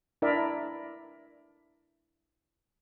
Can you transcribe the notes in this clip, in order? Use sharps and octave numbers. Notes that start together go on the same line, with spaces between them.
D4 E4 A#4 D5 E5